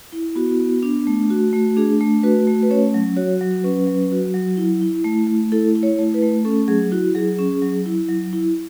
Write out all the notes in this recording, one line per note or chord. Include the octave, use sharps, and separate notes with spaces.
E4
B3 F#4
B3
D4
A3
F#4
A3
D4 G#4
A3
F#4 B4
A3
B4
C#4 C#5
F#3
F#4 C#5
F#3
C#4 B4
F#3
F#4
F#3
E4
E4
A3
A3
E4 A4
E4
C#5
A3
B4
A3
C#4 A4
F#3 G#4
E4 F#4
F#3 G#4
C#4
F#3
E4
F#3
E4